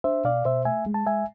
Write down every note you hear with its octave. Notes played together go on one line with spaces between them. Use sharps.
D4 C5 E5
B2 D5 F5
B2 C5 E5
A3 E5 G#5
G#3
A5
G#3 E5 G#5